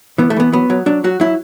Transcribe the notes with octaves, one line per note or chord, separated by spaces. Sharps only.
E3 B3
A3
E3 B3
F#3 B3
F#3
F#3 D4
F#3 F#4
F#3 E4